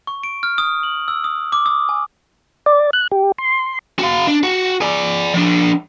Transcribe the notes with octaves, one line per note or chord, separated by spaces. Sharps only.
C#6
D7
F6
D#6
F#7
E6
D#6
D6
D#6
G#5
D5
F#6
G4
C6
F#4 F5
D4
F#4
G#4 D5
F3 D4